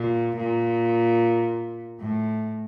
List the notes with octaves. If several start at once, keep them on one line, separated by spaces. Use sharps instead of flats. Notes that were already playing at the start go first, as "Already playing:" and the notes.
Already playing: A#2
A#2
A2